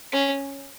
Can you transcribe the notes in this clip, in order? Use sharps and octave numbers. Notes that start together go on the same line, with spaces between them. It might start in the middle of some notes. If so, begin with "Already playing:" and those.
C#4